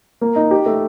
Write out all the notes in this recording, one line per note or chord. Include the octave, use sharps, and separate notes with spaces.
A#3
D#4
G4
A3